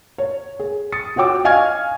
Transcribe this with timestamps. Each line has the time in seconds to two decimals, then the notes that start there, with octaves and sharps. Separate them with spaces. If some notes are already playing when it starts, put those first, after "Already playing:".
0.18 C#5
0.59 G#4
0.92 D#6 A6 C#7
1.16 F4 F#4 C#5 G5 D6 E6
1.45 D#5 F5 G#5 C#6 F6 G#6